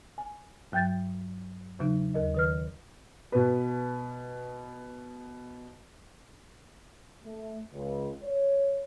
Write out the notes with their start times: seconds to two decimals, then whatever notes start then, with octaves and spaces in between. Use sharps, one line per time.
0.18 G#5
0.72 G2 F#3 G5 G6 A6
1.79 E2 C#3 F#3 D#4
2.14 D#2 A#4 D#5
2.34 D#3 B4 F6
3.32 B2 B4
7.24 A3
7.72 C#2
8.23 C#5